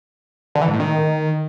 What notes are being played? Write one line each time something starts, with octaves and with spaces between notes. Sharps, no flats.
D3
E3
G#2
A2
D#3